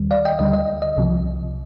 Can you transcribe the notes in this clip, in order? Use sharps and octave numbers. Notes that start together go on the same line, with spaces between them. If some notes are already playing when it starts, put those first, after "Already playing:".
Already playing: D#2 D#3 G3
D5 F5
D#5 G5
D2 D3 G3 D#5
D#5
D#5
C2 C3 F3